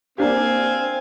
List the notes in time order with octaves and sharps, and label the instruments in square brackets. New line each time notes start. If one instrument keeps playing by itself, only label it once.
[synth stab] A#3 D4 G4 [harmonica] C4 [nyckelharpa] F5 G#5